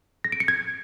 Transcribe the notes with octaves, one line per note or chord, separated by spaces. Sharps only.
A#6
D7
C#7
G#6